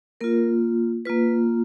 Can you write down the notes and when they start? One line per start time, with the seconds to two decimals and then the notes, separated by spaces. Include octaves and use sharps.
0.21 A#3 F4 A#4
1.05 A#3 F4 B4